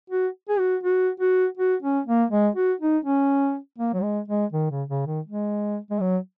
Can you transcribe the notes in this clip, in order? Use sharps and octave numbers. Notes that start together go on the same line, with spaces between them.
F#4
G#4
F#4
F#4
F#4
F#4
C#4
A#3
G#3
F#4
D#4
C#4
A#3
F#3
G#3
G#3
D#3
C#3
C#3
D#3
G#3
G#3
F#3